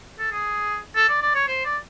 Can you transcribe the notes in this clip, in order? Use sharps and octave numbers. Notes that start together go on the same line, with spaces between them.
A4
G#4
A4
D5
D5
C#5
C5
D5